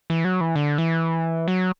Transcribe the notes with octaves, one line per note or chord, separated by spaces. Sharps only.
E3
F#3
E3
D3
E3
F#3